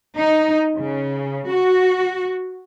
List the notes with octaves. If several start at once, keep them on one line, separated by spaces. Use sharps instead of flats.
D#4
C#3
F#4